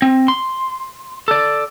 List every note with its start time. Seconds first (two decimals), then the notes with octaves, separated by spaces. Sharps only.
0.02 C4
0.28 C6
1.28 A4 D5